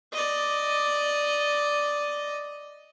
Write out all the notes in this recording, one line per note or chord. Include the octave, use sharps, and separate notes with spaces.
D5 D#5